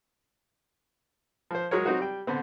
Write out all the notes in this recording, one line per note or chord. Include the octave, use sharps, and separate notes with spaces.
F3 C5
F#3 G#3 G#4 A#4 C#5
F#3 C4 D#4 F#4
G3 G5
D3 B3 C4